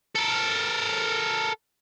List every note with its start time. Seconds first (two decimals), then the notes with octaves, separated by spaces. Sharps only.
0.15 A4 A#4